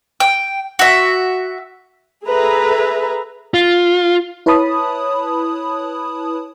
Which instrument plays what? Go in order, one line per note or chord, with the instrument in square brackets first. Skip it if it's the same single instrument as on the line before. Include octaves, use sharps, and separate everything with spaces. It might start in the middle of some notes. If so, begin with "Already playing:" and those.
[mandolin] G5
F#4 E5
[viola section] G#4 A4 B4 E5 A#5
[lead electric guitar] F4
[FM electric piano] E4 B4 C#5 A5 B5 D#6